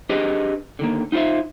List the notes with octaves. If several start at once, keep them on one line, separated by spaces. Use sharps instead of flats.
D4 G4 G#4 B4 D#5
D3 D#3 A#3
D#4 F4 G4 C5 E5